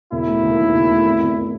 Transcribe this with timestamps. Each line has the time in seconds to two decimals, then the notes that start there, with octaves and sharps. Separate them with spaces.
0.12 E1 E4
0.27 A3
0.43 D#2
0.58 D#3
0.74 E1
0.89 A3
1.05 G#1
1.20 G#1